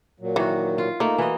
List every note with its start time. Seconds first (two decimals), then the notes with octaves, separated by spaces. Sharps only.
0.20 A#2 F#3
0.36 D#3 E3 F#4
0.78 F4
1.00 A3 A#3 D#4
1.18 E3 F#4 D#5